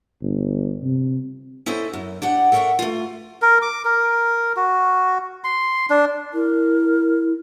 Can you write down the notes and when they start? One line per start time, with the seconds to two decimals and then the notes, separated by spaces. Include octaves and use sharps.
0.22 G1
0.83 C3
1.66 C#4 E4 A4 C5 D#5
1.93 F#2
2.22 D4 G4 F#5
2.52 A4 A#4 C#5 D#5 E5 F#5
2.79 A3 F4
3.42 A#4
3.62 D6
3.85 A#4
4.56 F#4
5.44 C6
5.90 D4
6.33 E4 A#4